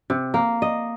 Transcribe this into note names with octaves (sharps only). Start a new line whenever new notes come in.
C3
A#3
D#5